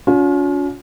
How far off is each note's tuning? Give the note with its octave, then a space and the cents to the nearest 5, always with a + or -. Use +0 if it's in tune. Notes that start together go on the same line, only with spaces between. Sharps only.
C#4 +40 F4 +45